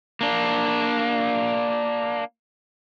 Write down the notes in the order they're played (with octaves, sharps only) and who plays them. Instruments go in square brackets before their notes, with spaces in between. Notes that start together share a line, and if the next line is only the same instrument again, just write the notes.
[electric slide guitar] A#3 D4